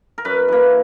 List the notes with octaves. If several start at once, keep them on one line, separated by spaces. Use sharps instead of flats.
A#4
F#2 B4
E3 A#3